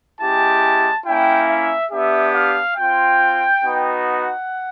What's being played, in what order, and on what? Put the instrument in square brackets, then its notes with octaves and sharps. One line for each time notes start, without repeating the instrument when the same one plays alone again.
[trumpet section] G#3 C#4 E4 G4 A5
A#3 C#4 E4 G5
E5
B3 D4 G4 E5
F5
C4 F4 G5
B3 D#4 F#4
F#5